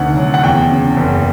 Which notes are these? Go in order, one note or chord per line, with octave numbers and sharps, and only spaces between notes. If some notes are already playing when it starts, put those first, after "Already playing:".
Already playing: D2 C3 D#3 F#5
F#3
F#5
E2 G5
C#3
F#1